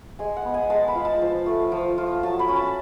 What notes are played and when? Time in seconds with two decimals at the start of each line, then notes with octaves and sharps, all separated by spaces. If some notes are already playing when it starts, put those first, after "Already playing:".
0.19 G#3 G#5
0.36 F#5
0.45 B3
0.54 G#5
0.70 G#3 A5
0.88 B5
0.95 F4
1.05 A5
1.22 F3
1.46 A3
1.72 F3
1.98 F4
2.23 F#3 A5
2.39 B5
2.48 C#4
2.56 A5